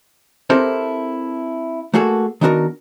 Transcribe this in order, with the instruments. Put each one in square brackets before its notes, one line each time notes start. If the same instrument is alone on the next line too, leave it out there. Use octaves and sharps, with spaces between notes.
[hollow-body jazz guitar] C4 E4 G4 A4 A#4 C5
A3 A#3 F#4 G#4 A4
D#3 B3 D4 F#4 A4 A#4